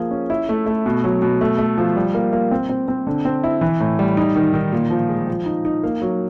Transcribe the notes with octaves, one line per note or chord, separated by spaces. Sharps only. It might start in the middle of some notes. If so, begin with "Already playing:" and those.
Already playing: F3 A#3 G#4
C#4
E4
A3
A3
B2
F#3
B2
A3
A3
F3
G3
A#3
A#3
C4
C4
C4
D3
C4
E4
E3
A2
G3
D#4
D#3
D#3
A#2
F3
G#3
F3
D#4
D#4
A#3
F#3